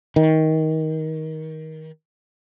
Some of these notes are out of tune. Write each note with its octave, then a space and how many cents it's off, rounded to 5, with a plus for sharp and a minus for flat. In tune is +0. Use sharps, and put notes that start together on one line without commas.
D#3 +20